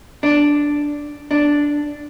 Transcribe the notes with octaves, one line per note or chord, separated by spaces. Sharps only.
D4
D4